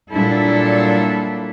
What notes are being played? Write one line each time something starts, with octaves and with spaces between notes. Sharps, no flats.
A#2 F#3 G3 D4 E4 A4